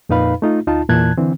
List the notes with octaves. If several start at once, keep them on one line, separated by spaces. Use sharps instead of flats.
F2 A#2 D#4 B4 F5 B5
A3 D#4 F4
D2 D#4 F4 A5
E2 A#2 E3 A5 F#6 G#6
D3 E3 C4